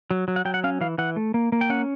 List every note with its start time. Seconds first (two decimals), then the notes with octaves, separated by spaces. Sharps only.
0.11 F#3
0.28 F#3
0.36 F#5
0.45 F#3 G5
0.54 F#5
0.64 C#4 F5
0.81 E3 F5
0.98 E3 F#5
1.16 A3
1.34 A#3
1.52 A#3
1.61 G5
1.70 C#4 F#5